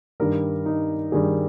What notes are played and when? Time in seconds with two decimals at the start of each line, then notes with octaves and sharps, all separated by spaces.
0.20 G2 D#3 G3 A#4
0.66 D#4
1.12 G2 D#3 G3 G#4